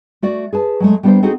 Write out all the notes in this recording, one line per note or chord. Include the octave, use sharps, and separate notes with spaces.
A3 F#4 D5
G#4 B4 A5
F#3 G#3 A3
G3 B3 D4 G#4 A#4 C5
C4 D#4 F#4 G#4 A4